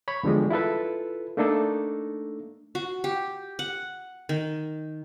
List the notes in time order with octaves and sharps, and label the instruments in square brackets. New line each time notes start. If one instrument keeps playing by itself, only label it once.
[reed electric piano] C#5 B5 C#6
E2 D3 F3 G3 G#3
E4 F4 A4 B4
A3 A#3 D4 D#4 A4
[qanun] F#4
G4
F#5
D#3